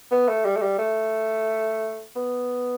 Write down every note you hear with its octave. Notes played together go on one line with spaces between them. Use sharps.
B3
A3
G3
A3
G3
A3
B3